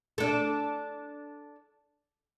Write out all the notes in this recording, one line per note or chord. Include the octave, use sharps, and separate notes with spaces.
D4 A4